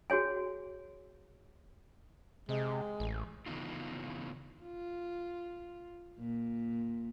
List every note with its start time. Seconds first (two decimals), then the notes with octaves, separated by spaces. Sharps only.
0.10 F#4 G#4 C#5 G#5
2.49 C3 G#3
3.00 A1
3.46 C#3 E3 B3 D#4 F4
4.62 F4
6.19 A#2